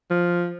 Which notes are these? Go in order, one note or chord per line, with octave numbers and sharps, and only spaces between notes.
F3